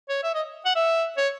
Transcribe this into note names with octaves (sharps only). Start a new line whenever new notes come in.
C#5
E5
D#5
F#5
E5
C#5